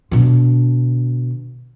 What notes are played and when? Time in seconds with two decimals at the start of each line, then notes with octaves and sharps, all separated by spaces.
0.11 B2 D3